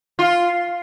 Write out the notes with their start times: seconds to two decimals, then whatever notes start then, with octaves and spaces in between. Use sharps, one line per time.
0.19 F4